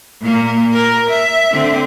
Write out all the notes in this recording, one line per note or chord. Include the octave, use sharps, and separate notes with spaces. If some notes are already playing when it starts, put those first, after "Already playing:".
A#2 A#3
A#4
E5
D3 C4